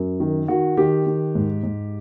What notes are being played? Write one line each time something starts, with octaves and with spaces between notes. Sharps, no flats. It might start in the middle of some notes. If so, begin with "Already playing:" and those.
Already playing: F#2
D#3
D#3 F#4
D#3 G4
D#3
G#2
G#2